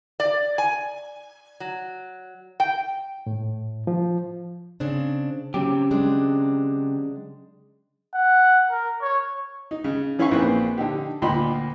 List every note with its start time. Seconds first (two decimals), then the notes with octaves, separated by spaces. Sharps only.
0.20 D5
0.58 G#5
1.60 F#3
2.60 G5
3.26 A2
3.87 F3
4.80 C#3 C4 D4
5.54 C#3 F#3 C4 G4
5.91 F#3 G#3 D4
8.15 F#5
8.71 A#4
9.02 C#5
9.71 D#4
9.84 C#3
10.19 E3 C#4 E4 F5 G#5 C#6
10.31 A#1 A#3 C4 B4
10.78 D3 D#4 G4
11.22 D2 A#2 D#5 G5 B5 C6